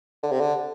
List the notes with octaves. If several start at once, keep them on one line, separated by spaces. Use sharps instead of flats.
D3
C3
D3